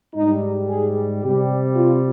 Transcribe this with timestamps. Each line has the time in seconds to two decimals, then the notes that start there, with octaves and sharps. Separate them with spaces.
0.14 G#2 G3 D#4
0.69 G#4
1.23 C3 G3 G4
1.76 F4